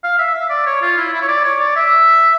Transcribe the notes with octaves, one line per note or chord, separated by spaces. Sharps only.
F5
E5
E5
D5
C#5
F4
E4
E4
C#5
D5
C#5
D5
E5